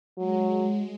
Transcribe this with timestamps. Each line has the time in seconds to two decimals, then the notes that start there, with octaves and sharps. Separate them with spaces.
0.18 F#3 G#3